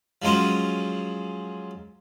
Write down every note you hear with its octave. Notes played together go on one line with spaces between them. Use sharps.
F3 F#3 G#3 C#4 C5